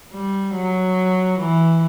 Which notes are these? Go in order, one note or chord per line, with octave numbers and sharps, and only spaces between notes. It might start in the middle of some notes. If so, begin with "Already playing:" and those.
G3
F#3
E3